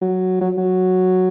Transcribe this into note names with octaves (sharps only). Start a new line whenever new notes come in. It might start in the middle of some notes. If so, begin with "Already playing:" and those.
F#3
F#3
F#3